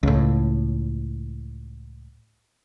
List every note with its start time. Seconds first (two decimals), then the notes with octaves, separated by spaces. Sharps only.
0.03 C#2 A2